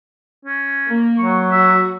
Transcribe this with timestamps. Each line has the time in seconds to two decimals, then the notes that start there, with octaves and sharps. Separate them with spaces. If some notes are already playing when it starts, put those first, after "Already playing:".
0.45 C#4
0.88 A#3
1.18 F#3 C#6
1.51 F#4 E5